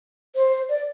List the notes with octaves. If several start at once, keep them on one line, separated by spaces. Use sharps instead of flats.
C5
D5